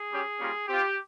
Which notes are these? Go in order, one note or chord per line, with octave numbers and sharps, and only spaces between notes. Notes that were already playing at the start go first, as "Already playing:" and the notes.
Already playing: G#4
G3 C#4 G4
G3 A#3 C#4 F4
C4 F4 G4